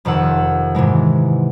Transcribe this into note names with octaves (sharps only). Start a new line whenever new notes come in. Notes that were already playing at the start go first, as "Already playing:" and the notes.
F1 F2 D#3 A4 F#5 E6
G#2 C3 E3 G#3